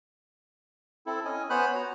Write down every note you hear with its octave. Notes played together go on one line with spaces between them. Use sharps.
C4 E4 A4
C#4 D#5 G#5
B3 C5 C#5 G#5 B5 F#6
F#4 A#5